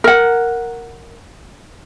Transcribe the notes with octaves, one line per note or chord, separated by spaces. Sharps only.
A#4 F#5